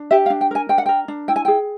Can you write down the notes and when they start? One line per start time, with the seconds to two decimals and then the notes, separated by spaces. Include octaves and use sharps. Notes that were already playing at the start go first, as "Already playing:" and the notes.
Already playing: D4
0.11 G4 E5
0.26 F5
0.30 D4
0.41 G5
0.51 A#4 G#5
0.69 D4 G5
0.78 F#5
0.86 A#4 G5
1.08 D4
1.28 E4 G5
1.36 G#5
1.45 G#4 G5